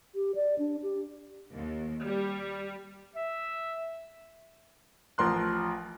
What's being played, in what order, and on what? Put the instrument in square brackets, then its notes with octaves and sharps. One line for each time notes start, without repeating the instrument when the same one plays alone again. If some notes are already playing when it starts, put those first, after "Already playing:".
[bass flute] G4
D5
D4
G4
[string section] D#2
G3
[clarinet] E5
[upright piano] A1 F3 A#4 C6 F#6